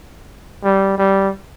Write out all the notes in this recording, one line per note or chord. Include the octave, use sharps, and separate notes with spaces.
G3
G3